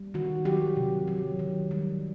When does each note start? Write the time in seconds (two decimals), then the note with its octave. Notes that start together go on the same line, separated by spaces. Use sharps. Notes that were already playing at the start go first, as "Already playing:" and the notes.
Already playing: G3
0.14 D#3 F#4
0.45 F#3 G4
0.77 C3
1.08 F#3
1.39 D#3
1.71 G3